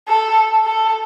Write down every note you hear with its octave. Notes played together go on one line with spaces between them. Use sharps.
A4
A4